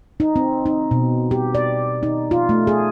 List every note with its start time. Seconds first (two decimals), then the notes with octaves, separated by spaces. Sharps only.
0.20 D#4
0.36 C4
0.66 D#4
0.91 B2
1.31 G4
1.55 D5
2.03 D#4
2.31 F4
2.49 A3
2.67 G#4